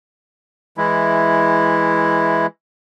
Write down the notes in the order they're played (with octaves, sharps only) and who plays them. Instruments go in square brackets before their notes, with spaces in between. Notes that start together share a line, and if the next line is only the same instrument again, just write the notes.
[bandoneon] E3 G#3 E4